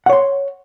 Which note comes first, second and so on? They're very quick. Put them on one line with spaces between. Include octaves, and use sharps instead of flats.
F#5 C#5 C6